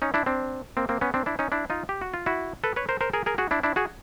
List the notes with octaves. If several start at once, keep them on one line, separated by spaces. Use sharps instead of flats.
C#4 D#4
D4 E4
C4 D4
A#3 C4
A#3 C4
B3 C#4
C4 D4
D4 E4
C#4 D#4
D4 E4
D#4 F4
G4
F#4
F4
E4 F#4
A4 B4
B4 C#5
A#4 C5
A#4 C5
G#4 A#4
G#4 A#4
F#4 G#4
D4 E4
D4 E4
F#4 G#4